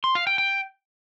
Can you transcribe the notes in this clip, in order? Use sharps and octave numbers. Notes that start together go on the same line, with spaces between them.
C6
F5
G5
G5